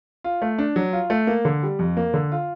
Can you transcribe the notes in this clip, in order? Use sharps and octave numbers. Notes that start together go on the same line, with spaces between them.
F4
A3
D4
F#3
F4
A3
A#3
D3
G3
F2
A#3
D3
F4